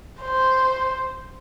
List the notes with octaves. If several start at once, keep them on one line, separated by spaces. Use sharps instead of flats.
C5